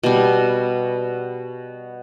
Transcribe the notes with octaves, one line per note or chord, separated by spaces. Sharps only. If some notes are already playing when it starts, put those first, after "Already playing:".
B2 G3